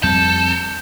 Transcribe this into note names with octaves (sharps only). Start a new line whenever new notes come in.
F2 G3 C4 A4 G6